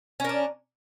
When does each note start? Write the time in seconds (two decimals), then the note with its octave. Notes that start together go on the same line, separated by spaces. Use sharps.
0.20 C#4
0.24 A#4
0.29 D4